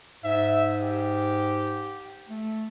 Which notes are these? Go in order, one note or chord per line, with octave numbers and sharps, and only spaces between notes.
G#2 E5
G4
A3